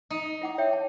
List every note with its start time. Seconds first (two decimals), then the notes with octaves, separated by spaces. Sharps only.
0.11 D#4
0.42 E4 F#5 D6
0.58 C#5 E5 G5
0.73 A5